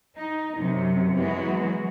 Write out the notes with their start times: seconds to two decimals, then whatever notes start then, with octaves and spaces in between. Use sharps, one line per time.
0.16 D#4
0.57 F#2 C3 F#3
1.15 E3 F#3 G#3 B3 F#4